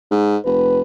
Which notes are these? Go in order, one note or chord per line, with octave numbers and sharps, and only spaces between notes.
G#2
F1 B4